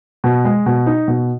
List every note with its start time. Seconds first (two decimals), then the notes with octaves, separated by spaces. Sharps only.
0.24 B2
0.45 G#3
0.66 B2
0.86 D#4
1.08 B2